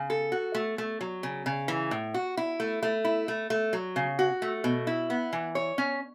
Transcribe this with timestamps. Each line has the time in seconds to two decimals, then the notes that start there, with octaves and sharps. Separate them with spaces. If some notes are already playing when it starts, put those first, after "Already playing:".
Already playing: C#3
0.10 A4
0.32 F#4
0.55 A3
0.78 A3
1.01 F#3
1.23 C#3
1.46 C#3
1.68 E3
1.91 A2
2.14 F#4
2.37 E4
2.60 A3
2.83 A3
3.05 E4
3.28 A3
3.50 A3
3.73 F#3
3.96 C#3
4.19 F#4
4.42 A3
4.64 B2
4.87 E4
5.10 B3
5.33 E3
5.55 C#5
5.78 C#4